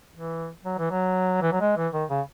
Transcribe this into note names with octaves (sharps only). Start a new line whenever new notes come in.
E3
F#3
E3
F#3
E3
F#3
G#3
E3
D#3
C#3